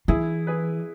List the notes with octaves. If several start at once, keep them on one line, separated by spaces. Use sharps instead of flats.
E3 E4 G#4
G#4 B4